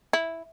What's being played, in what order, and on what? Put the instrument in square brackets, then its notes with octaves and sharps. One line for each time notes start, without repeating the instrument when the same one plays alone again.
[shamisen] E4